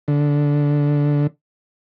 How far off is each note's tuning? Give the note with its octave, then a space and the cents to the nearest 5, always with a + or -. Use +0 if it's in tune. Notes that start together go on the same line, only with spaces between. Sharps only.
D3 -10